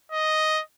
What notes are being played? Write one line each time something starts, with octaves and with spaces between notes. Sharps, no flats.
D#5